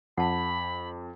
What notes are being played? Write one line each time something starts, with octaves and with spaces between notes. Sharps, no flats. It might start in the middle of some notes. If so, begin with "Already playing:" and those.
F2 F#5 A5 B5